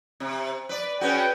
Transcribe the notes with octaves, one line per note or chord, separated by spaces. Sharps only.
C3
B4 D5
C#4 F#4 G#4 B4 G5